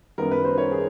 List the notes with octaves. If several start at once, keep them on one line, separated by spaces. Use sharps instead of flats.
F#2 D#3 G3 B3 A#4
B4
C5
C#5
G#4